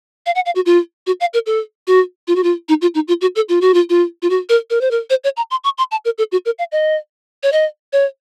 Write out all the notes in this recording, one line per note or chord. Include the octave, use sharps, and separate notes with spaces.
F5
F#5
F5
F#4
F4
F#4
F5
A#4
A4
F#4
F4
F#4
F4
D#4
F4
D#4
F4
F#4
A4
F4
F#4
F4
F4
F4
F#4
A#4
A#4
C5
A#4
C5
C#5
A#5
C6
C#6
C6
A5
A#4
A4
F#4
A#4
F5
D#5
C#5
D#5
C#5